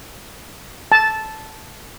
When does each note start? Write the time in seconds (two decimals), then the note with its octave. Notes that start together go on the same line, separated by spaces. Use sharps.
0.92 A5